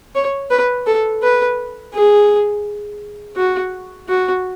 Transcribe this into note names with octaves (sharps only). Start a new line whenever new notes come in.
C#5
B4
A4
B4
G#4
F#4
F#4